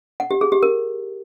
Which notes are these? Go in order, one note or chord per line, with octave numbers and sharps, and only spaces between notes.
F#5
G4
G#4
G4
A#4